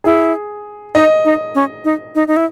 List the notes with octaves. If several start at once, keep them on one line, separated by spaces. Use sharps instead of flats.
E4 G#4
D#4 D#5
D#4
C#4
D#4
D#4
D#4
E4